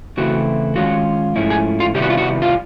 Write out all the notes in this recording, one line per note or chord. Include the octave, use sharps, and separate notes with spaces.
C#3 E3 A3 C4 E4 F#4
D#3 G#3 C#4 F4 F#4
G#2 F3 A3 C#4 E4
G#4
F4
C3 D#3 G3 B3 E4 G4
F#4
F4
F#4
F4